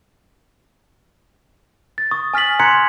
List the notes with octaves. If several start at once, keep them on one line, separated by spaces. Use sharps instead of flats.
A6
C#6 D#6
G#5 F6 A6 B6 F#7
A#5 C6 F#6 G#6 B6 C#7